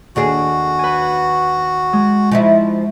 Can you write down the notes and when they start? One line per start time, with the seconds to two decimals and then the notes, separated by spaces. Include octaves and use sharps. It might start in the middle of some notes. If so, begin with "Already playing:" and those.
0.16 D#2 D4 F#4 G#4
0.79 B4 G#5
1.93 G#3
2.31 F3 D#4 E4